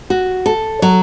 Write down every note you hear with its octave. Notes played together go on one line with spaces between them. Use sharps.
F#4
A4
F#3